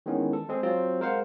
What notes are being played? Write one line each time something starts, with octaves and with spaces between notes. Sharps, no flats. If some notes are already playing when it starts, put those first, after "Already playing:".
D#3 E3 G#3 B3 C#4
A4
G#3 C4 G#4
F#3 C4 F4
G#3 A#4 C5 F5 F#5